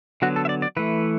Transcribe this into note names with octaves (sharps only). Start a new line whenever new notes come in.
D3 F#3 B3 F#4
A4
E5
D5
D5
E3 A3 B4